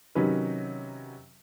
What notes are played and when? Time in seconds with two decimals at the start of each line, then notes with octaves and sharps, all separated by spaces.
0.15 C3 D#3 F#3 C#4 B4